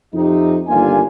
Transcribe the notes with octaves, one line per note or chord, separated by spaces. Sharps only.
F2 C3 D#4
G1 D#2 A#3 D4 F4 G#5